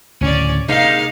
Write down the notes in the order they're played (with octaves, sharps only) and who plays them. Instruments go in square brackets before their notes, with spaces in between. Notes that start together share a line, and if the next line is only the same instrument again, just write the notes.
[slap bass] D2 A2 C#3 [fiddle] C#4 D5
[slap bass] C3 [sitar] G#3 A#3 D#4 [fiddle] F5